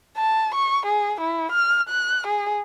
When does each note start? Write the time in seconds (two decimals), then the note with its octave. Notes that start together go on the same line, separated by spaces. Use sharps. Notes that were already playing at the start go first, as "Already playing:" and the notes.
0.17 A5
0.55 C#6
0.86 G#4
1.21 E4
1.52 F6
1.89 F#6
2.27 G#4